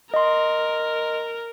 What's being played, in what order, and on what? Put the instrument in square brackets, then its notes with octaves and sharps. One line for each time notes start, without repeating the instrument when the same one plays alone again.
[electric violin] A#4 [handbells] D#5 C6